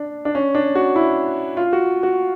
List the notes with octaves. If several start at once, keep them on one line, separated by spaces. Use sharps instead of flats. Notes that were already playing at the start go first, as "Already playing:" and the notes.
Already playing: D4
D4
C#4
D4
F#4
E4
F4
F#4
F#4